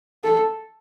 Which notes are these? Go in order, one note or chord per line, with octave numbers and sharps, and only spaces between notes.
A4